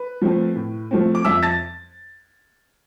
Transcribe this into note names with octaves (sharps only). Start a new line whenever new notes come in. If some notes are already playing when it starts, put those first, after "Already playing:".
Already playing: B4
F3 A3 C4
A2
F3 A3 C4
D6
F2 E5 E6
A5 A6